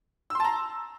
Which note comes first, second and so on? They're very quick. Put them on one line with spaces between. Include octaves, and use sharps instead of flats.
E6 C6 A5 A#5